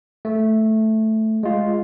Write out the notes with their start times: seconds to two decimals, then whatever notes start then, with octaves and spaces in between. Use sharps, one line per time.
0.25 A3
1.43 G#3 F4